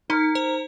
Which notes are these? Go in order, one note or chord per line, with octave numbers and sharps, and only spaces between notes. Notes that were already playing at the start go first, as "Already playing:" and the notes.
D#4 A#4
C5